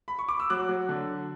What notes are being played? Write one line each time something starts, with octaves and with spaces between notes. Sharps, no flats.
B5
C#6
D6
E6
F#3 D6 F#6
F#3
D3